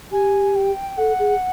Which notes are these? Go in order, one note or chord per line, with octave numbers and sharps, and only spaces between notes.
G4 G#5
G5
A4 F#5
G#4